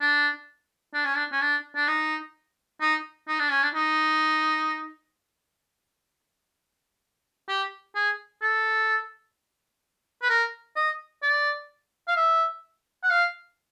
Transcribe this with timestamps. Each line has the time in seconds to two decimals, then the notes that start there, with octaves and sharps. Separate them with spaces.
0.01 D4
0.94 D4
1.05 C#4
1.16 D4
1.32 C#4
1.42 D4
1.76 D4
1.88 D#4
2.81 D#4
3.28 D#4
3.39 D4
3.51 C#4
3.63 D4
3.75 D#4
7.49 G4
7.96 G#4
8.42 A4
10.22 B4
10.30 A#4
10.76 D#5
11.23 D5
12.08 F5
12.16 E5
13.03 F#5
13.10 F5